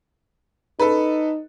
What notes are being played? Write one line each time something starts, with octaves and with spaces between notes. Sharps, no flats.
D#4 A4 B4